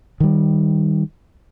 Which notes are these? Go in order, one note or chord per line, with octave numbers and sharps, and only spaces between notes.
D#3 G3